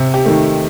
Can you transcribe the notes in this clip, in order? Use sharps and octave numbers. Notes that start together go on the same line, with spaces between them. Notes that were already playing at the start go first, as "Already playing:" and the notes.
Already playing: C3
G4
D#3 A3